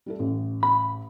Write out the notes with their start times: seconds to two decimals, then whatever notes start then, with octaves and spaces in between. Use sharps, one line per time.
0.06 G3 E4 A4
0.19 A1
0.63 B5